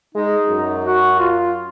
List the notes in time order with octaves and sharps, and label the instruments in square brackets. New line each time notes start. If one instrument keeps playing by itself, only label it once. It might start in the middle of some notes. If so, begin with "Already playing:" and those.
[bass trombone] G#3 [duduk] D#4
[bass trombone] F#2
[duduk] F#4
F4